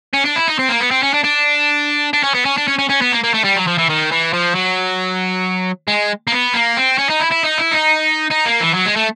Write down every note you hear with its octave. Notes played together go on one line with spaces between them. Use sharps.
C#4
D4
E4
D#4
C4
A#3
B3
C4
C#4
D4
D4
D4
C#4
B3
C#4
D4
C#4
C#4
C#4
B3
A#3
A#3
A3
G3
F#3
F3
E3
D#3
E3
F3
F#3
G#3
A#3
B3
A#3
C4
C#4
D#4
E4
E4
D#4
E4
D#4
D#4
A#3
E3
F#3
G#3
A3